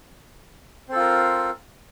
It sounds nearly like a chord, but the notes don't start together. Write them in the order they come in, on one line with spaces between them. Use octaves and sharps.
C4 A4 F4 A#4